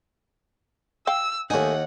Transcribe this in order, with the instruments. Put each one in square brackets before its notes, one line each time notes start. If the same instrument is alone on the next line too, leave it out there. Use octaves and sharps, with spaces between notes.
[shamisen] F5 G5 [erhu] E6
[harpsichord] D#2 D#4 [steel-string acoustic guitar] A3 G#5 [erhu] F#5